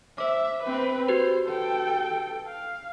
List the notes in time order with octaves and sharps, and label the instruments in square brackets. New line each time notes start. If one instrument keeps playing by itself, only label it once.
[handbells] C5 D6 [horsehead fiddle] E5
[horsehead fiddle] C4 B4
[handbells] F#4 G4 B4 [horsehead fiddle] C5
[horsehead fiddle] A4 G5
F5